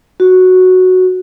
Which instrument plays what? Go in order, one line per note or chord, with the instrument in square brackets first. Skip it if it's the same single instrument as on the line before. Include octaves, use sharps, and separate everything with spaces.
[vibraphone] F#4